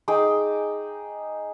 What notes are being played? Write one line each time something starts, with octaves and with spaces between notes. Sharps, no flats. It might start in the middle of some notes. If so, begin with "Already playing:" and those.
D#4 G#4 G5 D6